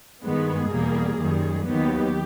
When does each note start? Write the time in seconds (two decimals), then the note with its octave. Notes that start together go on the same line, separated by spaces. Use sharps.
0.24 G2 D#3 G#3 B3 G#4
0.71 E2 B2 G3 A#3
1.18 F#2 D#3 G3
1.65 D#2 D#3 F#3 B3 G4